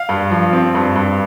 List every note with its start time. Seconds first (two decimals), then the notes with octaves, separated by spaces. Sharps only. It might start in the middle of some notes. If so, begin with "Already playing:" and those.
Already playing: F5
0.09 G2
0.30 F3
0.53 C4
0.75 G2
0.96 G2